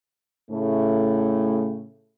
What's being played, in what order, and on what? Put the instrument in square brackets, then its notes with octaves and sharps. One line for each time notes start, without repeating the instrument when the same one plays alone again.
[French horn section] A2 C#3 A3